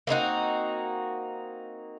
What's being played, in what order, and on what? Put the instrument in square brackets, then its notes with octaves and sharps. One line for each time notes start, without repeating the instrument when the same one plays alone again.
[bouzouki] A#3 C4 D#4 F#4